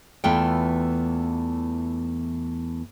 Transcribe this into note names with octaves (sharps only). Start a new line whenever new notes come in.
E2 E3 A3 B3 F4 G5